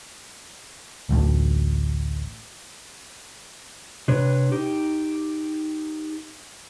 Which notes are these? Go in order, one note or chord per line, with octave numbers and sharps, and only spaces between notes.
D1 A1 D2
C3 D4 B4 C#5
D#4 G4